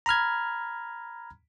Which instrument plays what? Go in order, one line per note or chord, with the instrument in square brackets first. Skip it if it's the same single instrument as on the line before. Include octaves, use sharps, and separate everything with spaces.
[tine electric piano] A#5 B5 F6 G#6